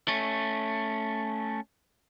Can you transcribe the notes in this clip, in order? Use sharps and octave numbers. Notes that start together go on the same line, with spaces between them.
A3 C#4